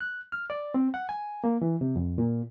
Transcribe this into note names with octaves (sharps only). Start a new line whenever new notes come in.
F#6
F6
D5
C4
F#5
G#5
A#3
E3
C3
F2
A#2